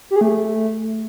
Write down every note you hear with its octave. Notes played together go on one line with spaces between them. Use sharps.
G4
G#4
A3